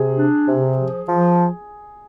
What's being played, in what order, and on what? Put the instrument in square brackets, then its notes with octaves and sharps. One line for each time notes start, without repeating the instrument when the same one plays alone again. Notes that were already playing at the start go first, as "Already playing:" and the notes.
Already playing: [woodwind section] C3 [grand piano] G#4
[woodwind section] D4
C3
F3
F3